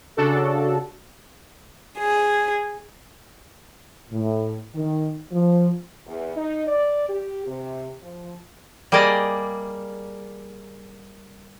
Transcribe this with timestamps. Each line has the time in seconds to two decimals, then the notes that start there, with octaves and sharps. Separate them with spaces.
0.17 C#3 D4 F#4 A4
1.99 G#4
4.11 A2
4.75 D#3
5.32 F3
6.06 E2
6.36 D#4
6.67 D5
7.09 G4
7.47 C3
8.02 F3
8.92 G3 A#3 G#4 D5 D#5